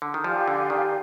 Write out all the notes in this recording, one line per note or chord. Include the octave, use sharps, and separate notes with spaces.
D3
D#3
F3 G4 D5 F5 G#5
D3
D#3